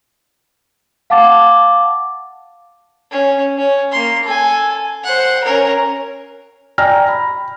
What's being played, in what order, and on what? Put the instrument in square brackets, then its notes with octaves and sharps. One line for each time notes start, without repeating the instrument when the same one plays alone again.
[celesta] F5 F#5 A5 D6 A6
[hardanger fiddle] C#4
C#4
A#3 C6
A4 G#5
C5 F#5
C#4 A#4
[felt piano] D5 G5 G#5 A#5 F6 A#6
B5